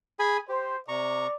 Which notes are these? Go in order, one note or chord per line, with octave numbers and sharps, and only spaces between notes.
G#4 G#5 B5
G4 C5
C3 D5 A#5 C#6